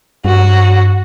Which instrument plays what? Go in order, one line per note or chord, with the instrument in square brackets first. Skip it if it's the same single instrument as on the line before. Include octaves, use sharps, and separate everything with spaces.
[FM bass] G2 [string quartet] F#4